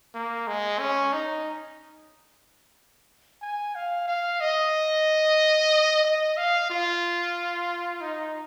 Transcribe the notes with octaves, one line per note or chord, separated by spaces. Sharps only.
A#3
G#3
C#4
D#4
G#5
F5
F5
D#5
D#5
F5
F4
D#4